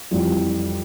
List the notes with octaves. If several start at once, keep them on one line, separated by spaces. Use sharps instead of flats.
F2 E3 G3